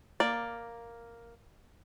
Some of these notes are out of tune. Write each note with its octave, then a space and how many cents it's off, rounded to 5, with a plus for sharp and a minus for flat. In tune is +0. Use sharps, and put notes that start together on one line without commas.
A#3 +0 D5 +0